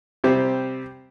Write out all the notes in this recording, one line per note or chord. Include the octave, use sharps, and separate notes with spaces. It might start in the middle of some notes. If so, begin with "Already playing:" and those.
C3 G3 C4 G4